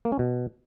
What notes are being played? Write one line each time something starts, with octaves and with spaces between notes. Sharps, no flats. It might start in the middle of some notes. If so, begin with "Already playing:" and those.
A#3
C#4
B2